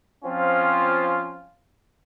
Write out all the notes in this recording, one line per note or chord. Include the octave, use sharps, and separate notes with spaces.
F3 C4 C#4 F4